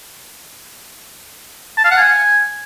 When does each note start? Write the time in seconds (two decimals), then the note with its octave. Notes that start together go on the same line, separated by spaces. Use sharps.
1.78 A5
1.84 F5
1.91 F#5
1.97 G#5